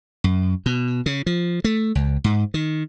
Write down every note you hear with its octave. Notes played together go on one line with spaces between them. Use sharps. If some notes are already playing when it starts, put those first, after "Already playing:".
F#2
B2
C#3
F3
A3
C#2
G#2
D#3